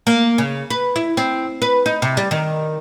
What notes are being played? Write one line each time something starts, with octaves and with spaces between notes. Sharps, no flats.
A#3
C#3
B4
E4
C4
B4
D#4
C3
G3
D#3